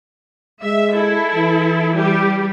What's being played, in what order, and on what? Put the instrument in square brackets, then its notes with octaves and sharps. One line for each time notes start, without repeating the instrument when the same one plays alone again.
[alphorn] G#3 [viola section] E5
[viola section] E4 A4
[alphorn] E3
[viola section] G3 G4